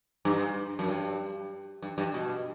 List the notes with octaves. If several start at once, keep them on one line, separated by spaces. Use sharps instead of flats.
G2
F#2
G2
G2
G2
B2